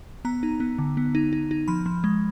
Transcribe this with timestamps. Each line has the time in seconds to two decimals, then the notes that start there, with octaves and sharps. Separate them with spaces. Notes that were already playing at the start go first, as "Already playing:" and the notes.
0.25 B3 A#5
0.43 D#4
0.60 B3
0.78 D3
0.97 B3
1.15 D#4
1.33 D#4
1.51 D#4
1.68 F3 B5
1.86 F3
2.04 G#3